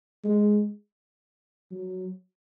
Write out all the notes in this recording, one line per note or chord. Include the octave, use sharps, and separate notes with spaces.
G#3
F#3